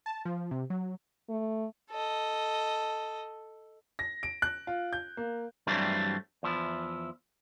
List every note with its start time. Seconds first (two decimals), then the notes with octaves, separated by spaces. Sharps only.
0.06 A5
0.25 F3
0.51 C3
0.70 F#3
1.29 A3
1.91 A4 D#5
3.99 A#6
4.23 D7
4.42 F#6
4.67 F4
4.93 G6
5.17 A#3
5.67 G2 E3 F#3 G3 A3 C4
6.43 E2 F3 E4